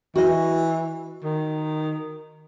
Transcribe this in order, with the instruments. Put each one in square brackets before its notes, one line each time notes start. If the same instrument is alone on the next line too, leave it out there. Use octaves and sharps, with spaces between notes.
[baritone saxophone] E3 [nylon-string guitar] F#4 D#5
[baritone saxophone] D#3